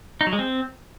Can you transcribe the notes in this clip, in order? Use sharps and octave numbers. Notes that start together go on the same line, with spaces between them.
D#4
F#3
G#3
C4